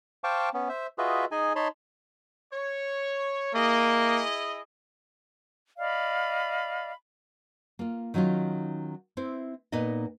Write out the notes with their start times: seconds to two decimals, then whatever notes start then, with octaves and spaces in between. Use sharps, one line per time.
0.24 C5 F5 G5 A5 C#6 D6
0.54 B3 C#4
0.69 C5 E5
0.98 F4 F#4 G#4 B4 D#5 E5
1.31 D#4 G#4 D#5 G#5
1.56 D#4 C#5 A5 B5 C6
2.52 C#5
3.54 A#3 E4 G#4 D#5
5.78 D5 D#5 F5 B5
7.79 A#3 F4
8.14 D#3 F#3 C#4 D#4 F4
9.17 C4 E4 C5
9.72 A#2 B3 D#4 D#5